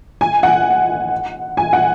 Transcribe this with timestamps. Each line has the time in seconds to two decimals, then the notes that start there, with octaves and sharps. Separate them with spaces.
0.21 G#5
0.43 F#5
1.57 G#5
1.73 F#5